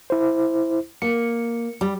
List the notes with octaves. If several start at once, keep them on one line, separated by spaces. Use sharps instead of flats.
E4 C5
A#3 C#7
G3